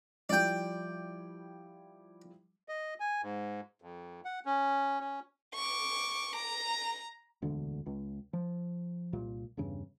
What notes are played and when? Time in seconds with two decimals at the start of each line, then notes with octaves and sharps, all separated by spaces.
0.29 F3 G3 E4 D5 G5
2.69 D#5
3.00 G#5
3.23 G#2
3.82 F2
4.25 F#5
4.45 C#4
5.00 C#4
5.55 C#6 D6
6.38 A#5
7.42 E1 D2 D3
7.86 C#2
8.33 F3
9.13 C2 A#2
9.57 E2 G2 C#3